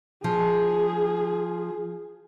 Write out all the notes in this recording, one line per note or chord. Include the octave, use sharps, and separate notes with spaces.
F3 G#4